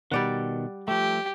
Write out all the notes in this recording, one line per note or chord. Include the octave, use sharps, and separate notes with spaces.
B2 D#3 G3 D5 F#5
F3 A3 G4